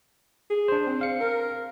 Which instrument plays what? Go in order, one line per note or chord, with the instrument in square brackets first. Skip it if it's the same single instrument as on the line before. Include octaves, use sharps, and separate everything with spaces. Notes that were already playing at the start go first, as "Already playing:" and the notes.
[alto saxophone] G#4
[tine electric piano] D4 C5
[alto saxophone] C4
[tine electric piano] F5 C#7
[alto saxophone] A#4